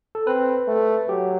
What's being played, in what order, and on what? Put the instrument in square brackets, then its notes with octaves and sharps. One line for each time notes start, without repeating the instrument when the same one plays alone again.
[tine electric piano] A4
[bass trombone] C4 [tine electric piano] B4
[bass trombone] A3
[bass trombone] F#3 [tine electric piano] G4